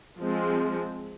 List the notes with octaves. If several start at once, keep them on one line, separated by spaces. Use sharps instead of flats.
F3 G#3 C4